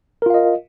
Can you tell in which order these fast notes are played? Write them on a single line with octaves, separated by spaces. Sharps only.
A#4 F4 F5 D#5